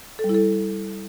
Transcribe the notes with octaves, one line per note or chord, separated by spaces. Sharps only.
A4
G3
E4
A4